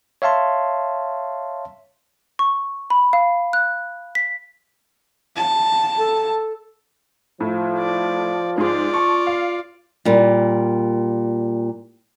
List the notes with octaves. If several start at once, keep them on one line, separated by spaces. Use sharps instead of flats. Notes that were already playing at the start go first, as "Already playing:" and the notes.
C#5 E5 F5 A5 C6
C#6
B5
F5
F#6
B6
A5
A4
A2 F3
D5
G#2 F4 G#4 D5 C6
A5 C#6
F5
A#2 G3